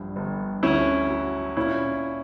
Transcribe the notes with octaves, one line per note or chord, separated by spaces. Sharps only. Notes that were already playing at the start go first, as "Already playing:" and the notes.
Already playing: A#1 G2
G1
D2 C#4 E4
F#3
A#2 C#4 E4